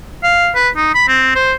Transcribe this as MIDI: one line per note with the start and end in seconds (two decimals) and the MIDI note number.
0.24 0.50 77
0.55 0.69 71
0.77 0.94 63
0.95 1.05 83
1.08 1.31 60
1.35 1.53 72